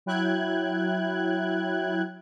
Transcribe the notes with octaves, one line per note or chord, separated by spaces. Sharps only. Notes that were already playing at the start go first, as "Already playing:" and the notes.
F#3 E4 G5 F#6 G#6